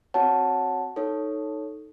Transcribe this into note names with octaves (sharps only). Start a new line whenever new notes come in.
C4 F#4 C#5 F#5 A5
D#4 A4 C#5